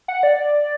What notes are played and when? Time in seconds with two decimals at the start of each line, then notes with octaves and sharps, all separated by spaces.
0.08 F#5
0.23 D5